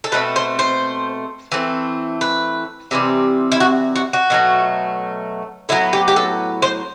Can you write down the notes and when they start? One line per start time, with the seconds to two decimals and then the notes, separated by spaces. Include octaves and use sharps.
0.04 A4
0.12 B2 A3 C4 B4
0.36 C5
0.59 C5
1.52 E3 A3 C4
2.21 B4
2.91 C3 E3 G3 C4
3.52 E4
3.60 F#4
3.96 F#4
4.13 F#4
4.30 B2 F#3 A3
5.69 A2 F#3 B3 E4
5.93 G4
6.08 G4
6.16 A4
6.62 C5